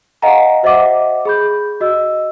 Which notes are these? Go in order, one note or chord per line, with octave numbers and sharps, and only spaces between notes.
D#5 F5 F#5 G#5 A#5 A#6
F#4 C5 D#5 E5 F#5 D6
G#4 B5 G6
F#4 D#5 E6